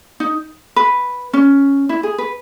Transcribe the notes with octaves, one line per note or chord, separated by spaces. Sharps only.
D#4
B4
C#4
E4
G#4
B4